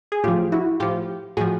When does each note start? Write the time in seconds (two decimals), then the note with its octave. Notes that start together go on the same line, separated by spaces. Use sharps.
0.12 G#4
0.24 A2 F4 G4
0.28 F3
0.52 E4 F#4
0.80 A2 F3 F4 G4
1.37 A2 F3 F#4 G#4